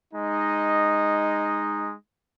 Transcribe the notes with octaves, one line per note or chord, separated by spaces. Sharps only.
G#3 D#4 D#5